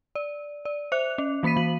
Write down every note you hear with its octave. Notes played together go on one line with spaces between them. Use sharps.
D5
D5
C5 E5 F#6 F7
C#4
E3 A#3 B5 B6 D#7
E3 F#7